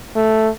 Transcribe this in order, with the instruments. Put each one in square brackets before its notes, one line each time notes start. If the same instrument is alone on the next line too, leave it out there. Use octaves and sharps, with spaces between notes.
[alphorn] A3